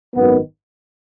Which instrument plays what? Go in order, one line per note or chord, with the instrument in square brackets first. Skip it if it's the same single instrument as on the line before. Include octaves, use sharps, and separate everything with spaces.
[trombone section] G#1 F#2 D#3 B3